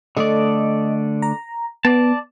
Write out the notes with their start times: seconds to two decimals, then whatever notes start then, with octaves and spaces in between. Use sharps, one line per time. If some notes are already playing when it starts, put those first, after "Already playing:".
0.17 D3 A3 A4 D5 D#5
1.22 A#5
1.85 B3 D5 A5